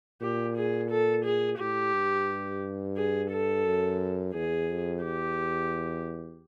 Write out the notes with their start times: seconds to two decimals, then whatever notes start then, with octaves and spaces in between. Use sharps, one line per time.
0.21 A#2 G4
0.57 G#4
0.90 A4
1.24 G#4
1.59 A2 G4
1.94 G2
2.97 G#4
3.31 A4
3.65 F#2
4.34 E2 G#4
4.69 F2
5.03 E2 G4